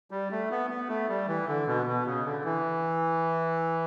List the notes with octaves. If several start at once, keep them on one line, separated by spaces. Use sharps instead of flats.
G3
A3
B3
B3
A3
G3
E3
D3
B2
B2
C#3
D3
E3